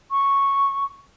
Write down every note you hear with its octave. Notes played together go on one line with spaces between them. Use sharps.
C#6